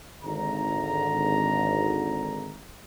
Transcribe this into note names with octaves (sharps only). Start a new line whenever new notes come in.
G#1 D3 A#5